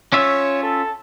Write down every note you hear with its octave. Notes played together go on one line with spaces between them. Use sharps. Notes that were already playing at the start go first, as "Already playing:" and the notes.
C#4 F4 C#5 E5
A4